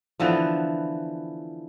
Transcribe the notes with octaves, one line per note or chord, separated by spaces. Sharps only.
D3 E3 F3 B3